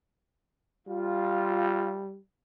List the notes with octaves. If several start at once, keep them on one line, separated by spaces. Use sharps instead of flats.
G3 F4